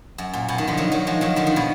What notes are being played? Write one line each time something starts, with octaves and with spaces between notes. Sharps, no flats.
F#2
A#2
B2
D#3
D3 F3
D#3 F#3
D#3 F#3
F3 G#3
D#3 F#3
D3 F3
D#3
B2